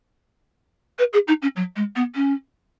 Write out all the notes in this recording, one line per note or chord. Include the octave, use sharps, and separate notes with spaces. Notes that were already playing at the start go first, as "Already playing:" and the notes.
B4
G#4
D#4
C#4
F#3
G#3
B3
C#4